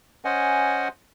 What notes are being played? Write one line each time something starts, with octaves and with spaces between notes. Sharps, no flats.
C#4 C5 D#5 F#5 G#5